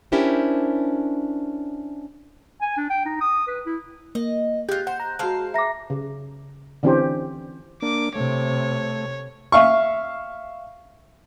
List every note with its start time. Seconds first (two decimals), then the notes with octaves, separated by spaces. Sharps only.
0.12 C#4 D4 E4 G4 A#4 C5
2.61 G#5
2.77 D4
2.90 G5
3.05 D#4
3.21 D#6
3.47 B4
3.66 E4
4.15 A#3 D#5
4.69 G#3 F4 G4 F#6 G6
4.87 C5 F#5
5.00 A#5
5.19 G#3 F#4 C5 F5 A5
5.54 E5 A#5 D6 A#6
5.90 C#3
6.83 D3 E3 C4 C#4 G4 C5
7.82 A#3 D4 D6
8.15 C3 A3 C#5
9.52 E5 F5 C#6